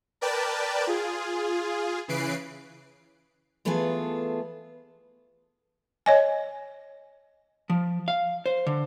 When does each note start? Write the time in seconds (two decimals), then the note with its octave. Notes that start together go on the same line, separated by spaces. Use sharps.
0.21 A#4 B4 D5 G5 A5
0.87 F4 G#4
2.08 C#3 E3 B4 C7 D7
3.65 E3 A3 B3 F4 G#4 A4
6.06 C#5 D#5 G#5
7.70 F3
8.08 F5
8.46 C5
8.67 D3